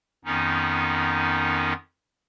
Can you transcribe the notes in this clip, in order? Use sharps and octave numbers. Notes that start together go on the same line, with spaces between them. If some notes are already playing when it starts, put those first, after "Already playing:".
F2 D#3 B3 C#4 D#4